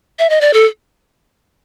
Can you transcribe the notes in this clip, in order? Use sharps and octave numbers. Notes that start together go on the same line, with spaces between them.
E5
D#5
D5
A4